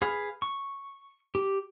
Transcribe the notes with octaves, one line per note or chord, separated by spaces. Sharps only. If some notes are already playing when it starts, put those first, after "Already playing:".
G#4 B4 F5
C#6
G4